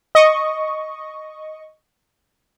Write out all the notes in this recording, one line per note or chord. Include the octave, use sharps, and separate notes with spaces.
D#5 C#6